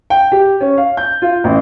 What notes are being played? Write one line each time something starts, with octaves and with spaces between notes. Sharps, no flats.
G5
G4
C#4
F5
G6
F4
A1